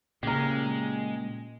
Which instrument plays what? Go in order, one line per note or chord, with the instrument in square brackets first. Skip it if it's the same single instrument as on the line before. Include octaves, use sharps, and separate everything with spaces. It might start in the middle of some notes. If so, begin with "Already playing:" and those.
[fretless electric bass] A#2 C#3 [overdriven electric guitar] G#3 [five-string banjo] G4 A#4